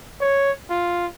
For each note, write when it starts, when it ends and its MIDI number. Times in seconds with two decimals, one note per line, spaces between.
0.21 0.51 73
0.70 1.06 65